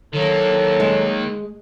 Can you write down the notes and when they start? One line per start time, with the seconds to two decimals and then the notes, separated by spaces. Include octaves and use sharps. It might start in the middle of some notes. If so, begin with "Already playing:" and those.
0.13 D#3 F#3 A#3 A4
0.80 G#3